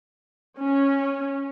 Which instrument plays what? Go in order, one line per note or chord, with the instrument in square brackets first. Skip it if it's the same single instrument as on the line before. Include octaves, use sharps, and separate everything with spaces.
[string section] C#4